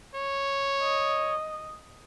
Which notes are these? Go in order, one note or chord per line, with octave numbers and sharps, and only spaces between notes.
C#5
D#5